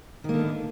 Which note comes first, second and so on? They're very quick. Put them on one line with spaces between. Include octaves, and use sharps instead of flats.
D#3 A#3 D3 B3